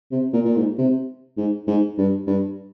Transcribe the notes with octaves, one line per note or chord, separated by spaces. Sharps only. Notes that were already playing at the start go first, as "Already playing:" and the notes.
C3
A#2
A#2
G#2
C3
G#2
G#2
G2
G2